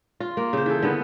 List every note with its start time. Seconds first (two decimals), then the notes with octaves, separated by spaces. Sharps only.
0.20 F4
0.37 A#3
0.53 C#3 C5
0.66 E3 A4
0.82 D3 B3